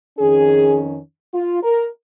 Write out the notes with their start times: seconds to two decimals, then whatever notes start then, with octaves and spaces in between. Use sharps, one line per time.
0.19 F2 D#3 C#4 G#4
1.34 F4
1.62 A#4